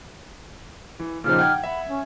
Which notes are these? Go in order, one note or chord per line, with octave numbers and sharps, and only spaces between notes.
E3
A#2 C#3 F3 D#4 G4 F6
F#5 G5 G#6
E5 F#5 B5
C#4